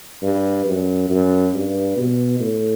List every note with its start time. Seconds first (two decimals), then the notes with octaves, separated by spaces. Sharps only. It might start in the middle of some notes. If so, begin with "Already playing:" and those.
0.22 G2
0.66 F#2
1.09 F#2
1.53 G2
1.96 B2
2.40 A2